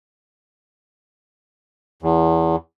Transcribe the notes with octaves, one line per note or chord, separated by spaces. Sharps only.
E2